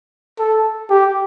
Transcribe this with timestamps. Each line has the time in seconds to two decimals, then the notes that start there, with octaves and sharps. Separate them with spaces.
0.39 A4
0.90 G4